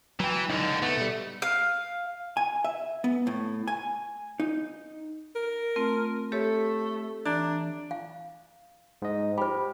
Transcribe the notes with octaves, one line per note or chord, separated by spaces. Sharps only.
E3 F#3 G5
C#2 D3 D#4
A3 B3
B2 G3
F5
G#5
E5
B3
A2
G#5
D#4
A#4
A3 C4 F4
A3 G4 A4 C#5
E3 D4 A#5
F5
G#2 D#5
G4 C5 B5